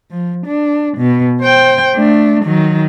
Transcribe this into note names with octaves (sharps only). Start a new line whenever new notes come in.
F3
D4
B2
C5 G5
A3 D4
D#3 F#3